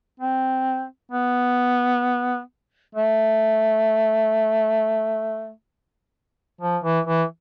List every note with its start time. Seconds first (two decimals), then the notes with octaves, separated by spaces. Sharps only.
0.20 C4
1.12 B3
2.95 A3
6.61 F3
6.84 E3
7.07 E3